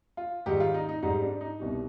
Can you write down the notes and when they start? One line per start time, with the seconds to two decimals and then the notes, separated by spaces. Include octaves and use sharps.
0.17 F4
0.46 G#2 D#3 G3 G4
0.60 F4
0.74 D#4
0.89 D#4
1.02 G#2 G3 D#4
1.22 D4
1.41 D#4
1.60 C2 B2 G3